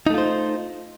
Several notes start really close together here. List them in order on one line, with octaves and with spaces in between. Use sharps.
D#4 A3 F4 C5